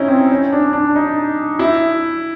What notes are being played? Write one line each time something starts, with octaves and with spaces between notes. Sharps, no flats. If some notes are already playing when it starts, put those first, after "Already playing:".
Already playing: C#4 D#4 E4
C4
C#4
D4
D4
D#4
E4